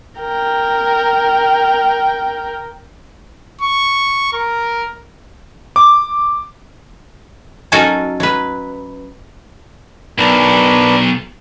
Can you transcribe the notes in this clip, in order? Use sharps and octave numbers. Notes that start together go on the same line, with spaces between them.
A#4 G5
C#6
A#4
D6
F#3 C#4 D#4 F#4 A4 A#4
F#3 B4
B1 D4 A#4 B4